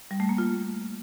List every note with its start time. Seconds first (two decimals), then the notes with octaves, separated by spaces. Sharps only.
0.11 G3
0.20 A3
0.29 A#3
0.38 F4